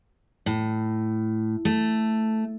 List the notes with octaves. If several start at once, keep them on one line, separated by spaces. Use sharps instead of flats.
A2
A3